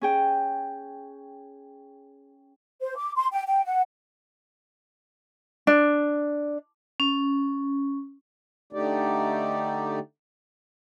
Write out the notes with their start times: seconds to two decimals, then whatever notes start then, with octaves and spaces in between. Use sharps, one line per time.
0.01 C#4 G#4 G5
2.81 C5
2.97 D6
3.16 C6
3.32 G5
3.47 G5
3.65 F#5
5.67 D4
7.00 C#4
8.73 D3 A3 D#4 G4 D5